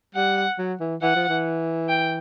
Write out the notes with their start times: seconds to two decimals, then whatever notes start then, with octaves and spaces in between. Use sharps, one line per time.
0.15 G3 F#5
0.58 F#3
0.80 E3
1.02 E3 F#5
1.16 F3
1.29 E3
1.89 G5